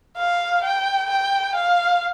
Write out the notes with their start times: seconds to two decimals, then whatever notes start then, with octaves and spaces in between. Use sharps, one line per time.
0.18 F5
0.64 G5
1.10 G5
1.55 F5